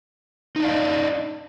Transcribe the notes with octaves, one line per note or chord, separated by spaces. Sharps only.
D4 D#4 D#5 F5